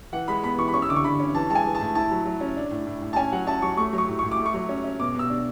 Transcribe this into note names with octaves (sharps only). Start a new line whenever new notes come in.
E3 F#5
G#3 B5
B3 B5
E3 C#6
B5
C#4 C#6
E6
D3 D6
C#6
D3 B5
C#4
E3 A5
G#3 A5
G#5
E3
A5
A2
E4 A5
F#3
F#3
C#4
D4
A2
A2
A2
A5
C#4 G#5
F#3 F#5
C#4 A5
F#3 C#6
A3 C#6
F#3
C#6
A2
A2 C#6
D6
A3
C#6
F#3
C#4
C#4
B2 D6
B2 E6
D4